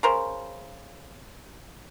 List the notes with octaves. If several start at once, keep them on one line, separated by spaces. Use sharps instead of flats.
C#3 A#4 C5